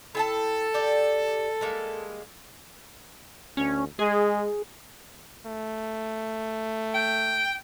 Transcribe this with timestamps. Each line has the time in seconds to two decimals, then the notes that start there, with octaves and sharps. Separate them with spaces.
0.15 E4 A4 G5 A5
0.74 G4 D5 G5
1.61 G3 G#3 A#3
3.57 D2 C#4
3.99 G#3 G#4
5.46 A3
6.95 G5